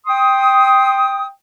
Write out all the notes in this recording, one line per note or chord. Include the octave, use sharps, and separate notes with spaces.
G5 C6 D#6